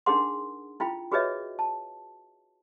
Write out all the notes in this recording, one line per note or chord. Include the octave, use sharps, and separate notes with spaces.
D4 D#4 G#4 A#4 F#5 C6
E4 F4 G5 B5
F#4 G#4 B4 C#5 D#5 E5
A5